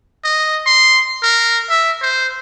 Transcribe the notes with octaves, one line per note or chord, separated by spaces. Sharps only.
D#5
C6
A#4
E5
C5